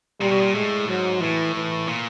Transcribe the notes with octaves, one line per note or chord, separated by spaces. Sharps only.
A#2 G3
B2
A#2
A2 G#3
G#2 F#3
A2 E3
E3
A#2